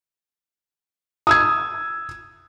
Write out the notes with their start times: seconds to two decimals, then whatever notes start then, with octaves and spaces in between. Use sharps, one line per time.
1.27 D#6 E6 G#6